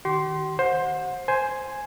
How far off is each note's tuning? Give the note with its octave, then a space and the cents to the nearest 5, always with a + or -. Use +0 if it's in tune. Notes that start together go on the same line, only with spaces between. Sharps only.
D#3 -5 G4 -40 C6 +0
C5 +15 F#5 -30
C5 +0 G#5 +0